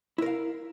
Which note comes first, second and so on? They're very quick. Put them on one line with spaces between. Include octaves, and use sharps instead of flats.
E4 A#4 F5